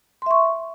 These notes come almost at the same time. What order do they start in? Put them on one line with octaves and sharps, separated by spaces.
C6 E5 C#6